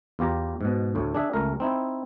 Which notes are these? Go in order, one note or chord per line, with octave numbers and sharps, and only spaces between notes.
E2 F4 G4 A#5
G#2 B2
D2 A2
D4 G#4 E5
C#2 A3 A#4
C4 D#4 E4